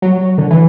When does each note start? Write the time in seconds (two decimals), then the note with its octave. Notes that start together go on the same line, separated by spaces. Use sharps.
0.02 F#3
0.38 D3
0.51 E3